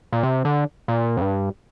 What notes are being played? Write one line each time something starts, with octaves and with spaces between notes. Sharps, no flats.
A#2
C3
D3
A#2
F2
G2